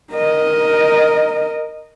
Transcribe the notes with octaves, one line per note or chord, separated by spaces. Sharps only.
A#4 D#5